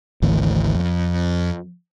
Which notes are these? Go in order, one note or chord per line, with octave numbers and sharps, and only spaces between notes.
G#1 D2 E3
F2